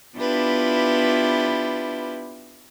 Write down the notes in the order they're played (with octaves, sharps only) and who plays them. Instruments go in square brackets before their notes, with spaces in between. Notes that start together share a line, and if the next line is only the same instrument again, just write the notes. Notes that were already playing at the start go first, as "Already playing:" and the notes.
[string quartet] B3 D4 E4 F4 G4 B4